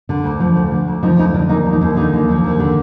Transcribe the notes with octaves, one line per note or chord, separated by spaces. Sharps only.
D3
D2
F3
D2
D3
D2
F3 D#4
D2 D#4
D3 D4
D#2 D#4
F3
D#4
D#2
D3 D#4
D#2
F3
D#2
D3